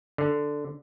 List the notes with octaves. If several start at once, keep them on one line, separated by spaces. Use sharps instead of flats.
D3